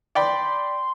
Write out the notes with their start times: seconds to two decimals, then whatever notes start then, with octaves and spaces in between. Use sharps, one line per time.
0.15 D5 G5 B5 C6